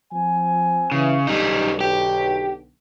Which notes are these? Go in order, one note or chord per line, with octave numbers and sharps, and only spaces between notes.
F3 C4 G#5
C#3 E3
B1 D3 G3 D#4
G4